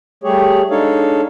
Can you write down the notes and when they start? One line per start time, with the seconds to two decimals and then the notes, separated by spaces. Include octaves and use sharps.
0.24 G3 A3 G4 G#4 C#5
0.70 G#3 D4 D#4 A4 C#5 F5